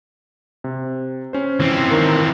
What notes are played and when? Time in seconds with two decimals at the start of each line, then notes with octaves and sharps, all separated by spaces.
0.64 C3
1.33 C#4 C5
1.60 E3 C4
1.90 D#3 A#4 C#7